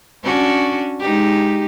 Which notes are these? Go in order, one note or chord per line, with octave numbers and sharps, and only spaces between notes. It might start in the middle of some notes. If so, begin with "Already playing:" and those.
C#4 D4 F#4
G#3 D#4 G4